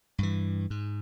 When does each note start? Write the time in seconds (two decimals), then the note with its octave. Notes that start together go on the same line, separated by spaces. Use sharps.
0.18 G2 E3
0.70 G#2